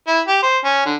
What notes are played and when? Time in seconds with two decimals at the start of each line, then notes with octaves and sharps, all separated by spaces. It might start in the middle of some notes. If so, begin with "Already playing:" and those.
0.08 E4
0.28 G4
0.43 C5
0.64 C#4
0.85 D3